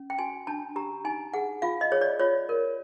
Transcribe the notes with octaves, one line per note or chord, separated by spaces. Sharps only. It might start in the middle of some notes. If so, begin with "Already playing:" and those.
Already playing: C#4
G5
F#4 G#5
D4 A5
G4 A#5
D#4 G#5
G#4 F#5
F4 F5
D#5
G#4 C#5
D5
F4 C#5
A#4